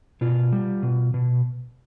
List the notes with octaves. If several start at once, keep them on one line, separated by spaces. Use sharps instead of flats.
B2 F4
G3
B2
B2